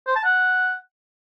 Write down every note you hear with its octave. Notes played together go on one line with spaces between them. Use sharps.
C5
A5
F#5